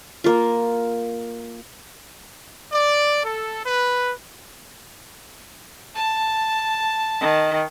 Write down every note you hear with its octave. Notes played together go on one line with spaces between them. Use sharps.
A#3 F4
D5
A4
B4
A5
D#3